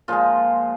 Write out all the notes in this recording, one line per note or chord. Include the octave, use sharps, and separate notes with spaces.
A#2 F3 G#3 D#4 F4